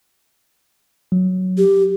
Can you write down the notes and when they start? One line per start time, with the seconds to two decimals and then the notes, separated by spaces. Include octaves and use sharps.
1.12 F#3
1.58 G4